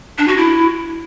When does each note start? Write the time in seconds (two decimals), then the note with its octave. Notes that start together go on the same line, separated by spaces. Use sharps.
0.18 D4
0.28 F#4
0.37 E4